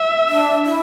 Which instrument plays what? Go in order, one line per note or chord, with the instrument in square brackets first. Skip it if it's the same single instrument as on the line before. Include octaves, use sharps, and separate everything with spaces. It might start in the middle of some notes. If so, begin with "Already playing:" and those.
Already playing: [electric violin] E5
[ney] D4
E4